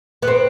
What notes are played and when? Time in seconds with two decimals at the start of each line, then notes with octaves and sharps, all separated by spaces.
0.22 B3
0.28 C4